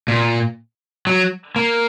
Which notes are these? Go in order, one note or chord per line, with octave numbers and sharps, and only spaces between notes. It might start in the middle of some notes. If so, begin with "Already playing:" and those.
A#2
F#3
A#3